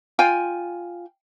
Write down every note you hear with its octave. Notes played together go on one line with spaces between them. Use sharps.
F4 G5 G#5